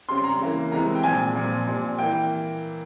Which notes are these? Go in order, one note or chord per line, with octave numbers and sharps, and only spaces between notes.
C#3 G3 C4 C6
A#5
C#3 E3 A#3
C3 E3 G#3 C4 A#5
G5
A#2 F3 G#3 C4 G#5
A#2 F3 C4
A#2 G3 C4
E3 A#3 G5